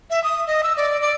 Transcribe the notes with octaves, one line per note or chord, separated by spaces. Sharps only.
E5
D#6
D#5
E6
D5
D5